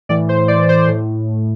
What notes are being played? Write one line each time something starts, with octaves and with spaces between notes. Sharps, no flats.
A2 E3 D5
C5
D5
C5
A2